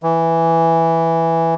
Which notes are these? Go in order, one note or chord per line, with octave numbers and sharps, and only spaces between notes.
E3